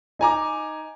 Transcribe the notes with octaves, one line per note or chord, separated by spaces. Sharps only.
D#4 G#5 A#5 D6